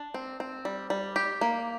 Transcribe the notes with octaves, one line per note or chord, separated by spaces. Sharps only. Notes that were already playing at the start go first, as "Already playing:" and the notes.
Already playing: D4
C4
C4
G3
G3
G4
A#3